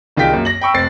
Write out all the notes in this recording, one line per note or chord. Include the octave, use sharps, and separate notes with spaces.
C2 D#3 F4 G#4 G5 B6
F#2 A#3
A#6 F#7
G5 B5 C#6 E6
F1 C4 A6 C7